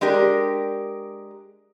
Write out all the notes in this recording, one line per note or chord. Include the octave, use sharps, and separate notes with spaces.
G#3 D4 G4 A#4